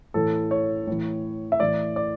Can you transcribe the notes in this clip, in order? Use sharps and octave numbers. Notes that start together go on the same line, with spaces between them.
A2 E3 A4
C#5
A2 E3
E5
A2 E3 D5
D5